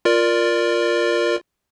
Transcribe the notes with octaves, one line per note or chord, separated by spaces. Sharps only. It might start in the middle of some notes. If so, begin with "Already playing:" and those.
F4 A#4 D5